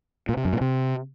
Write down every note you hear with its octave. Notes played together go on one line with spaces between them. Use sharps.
A#2
C3
F#2
A#2
C3